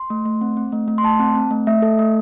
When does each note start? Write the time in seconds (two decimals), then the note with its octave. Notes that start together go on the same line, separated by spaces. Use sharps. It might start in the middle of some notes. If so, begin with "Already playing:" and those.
Already playing: C6
0.10 A3
0.25 A3
0.41 C4
0.57 C4
0.72 A3
0.88 A3
0.98 C6
1.03 A3 A5
1.19 C4
1.35 C4
1.51 A3
1.67 A3 E5
1.82 A4
1.99 A3